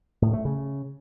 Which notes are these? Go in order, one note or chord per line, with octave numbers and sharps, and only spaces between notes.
A2
A3
C#3